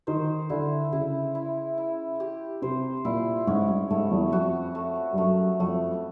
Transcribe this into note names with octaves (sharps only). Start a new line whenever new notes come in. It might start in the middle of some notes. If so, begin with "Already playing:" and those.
D#3 C5
D3 E4
C#3 E4
E4
E4
G4
C3 C5
A#2 E4
G#2 C#4
G2
G#2 A3
E2
F2 F#4
A3
G2
F#2 A3
F2 A3